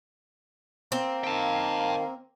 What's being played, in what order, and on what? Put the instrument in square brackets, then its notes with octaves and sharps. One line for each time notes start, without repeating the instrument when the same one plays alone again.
[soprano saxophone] A#3 [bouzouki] C4
[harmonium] D#3 F5 [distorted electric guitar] G5 A5